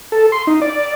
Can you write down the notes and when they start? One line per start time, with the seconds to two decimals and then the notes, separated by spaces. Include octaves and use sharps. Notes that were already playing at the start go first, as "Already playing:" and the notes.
0.12 A4
0.32 C6
0.47 D#4
0.62 D5